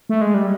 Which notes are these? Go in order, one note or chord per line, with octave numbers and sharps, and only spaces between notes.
A3
G#3
G3